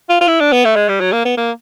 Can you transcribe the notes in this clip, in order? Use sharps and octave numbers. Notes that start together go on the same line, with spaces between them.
F4
F4
E4
D4
B3
A3
G#3
G3
F#3
A#3
B3
A#3